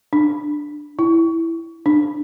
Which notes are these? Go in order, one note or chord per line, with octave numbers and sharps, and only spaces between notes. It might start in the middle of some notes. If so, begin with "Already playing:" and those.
D4
E4
D4